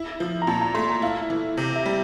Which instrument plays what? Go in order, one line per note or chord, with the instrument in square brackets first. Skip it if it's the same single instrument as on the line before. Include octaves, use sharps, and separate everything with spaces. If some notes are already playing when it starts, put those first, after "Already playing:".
Already playing: [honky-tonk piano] E4
F3
[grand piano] A#5
[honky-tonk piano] A#2 [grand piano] A5
[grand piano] A#5
[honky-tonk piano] A3 [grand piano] C6
[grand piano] A#5
[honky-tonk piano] E4 [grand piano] F5
[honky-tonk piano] E3
C3
[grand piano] E5
[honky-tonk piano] G3